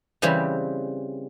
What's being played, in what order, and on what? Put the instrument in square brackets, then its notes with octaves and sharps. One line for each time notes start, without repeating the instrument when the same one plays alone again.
[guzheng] C#3 E3 G3 C4 G4